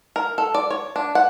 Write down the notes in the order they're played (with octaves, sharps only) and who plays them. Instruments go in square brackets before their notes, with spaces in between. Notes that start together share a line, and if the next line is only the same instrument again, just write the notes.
[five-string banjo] A#4
A4
D5
C#5
D4
F#5